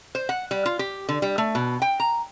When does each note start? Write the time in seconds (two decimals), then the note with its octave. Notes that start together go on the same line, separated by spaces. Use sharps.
0.15 C5
0.29 F#5
0.51 G3
0.66 F4
0.79 G4
1.09 D3
1.22 G3
1.38 A3
1.55 B2
1.82 G5
2.00 A#5